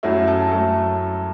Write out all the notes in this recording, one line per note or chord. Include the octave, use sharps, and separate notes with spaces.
F#2 F#3 A3 E4
A4
F#2 F#3 A3 A4